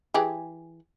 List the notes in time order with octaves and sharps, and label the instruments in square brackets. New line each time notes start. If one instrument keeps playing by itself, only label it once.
[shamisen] E3 G4 G#4